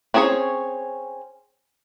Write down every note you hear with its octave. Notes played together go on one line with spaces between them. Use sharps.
C4 C#4 G#4 C5 C#5